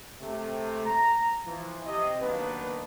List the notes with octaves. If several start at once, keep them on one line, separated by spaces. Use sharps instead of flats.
C3 A3
A#5
E3 F3
C3 D#5
D#3 F#3 A#3 B3 D4 B4